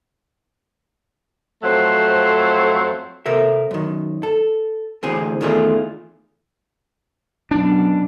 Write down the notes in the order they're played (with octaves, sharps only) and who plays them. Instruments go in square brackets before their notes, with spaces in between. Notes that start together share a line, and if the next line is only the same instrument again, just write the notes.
[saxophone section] F2 F#3 A3 C5
[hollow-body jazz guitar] C3 A4 A#4 E5
F#2 D#3
A4
D2 A2 E3 C4 G#4
E2 D#3 A3 F4 G#4
[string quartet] F#2 B2 [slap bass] D4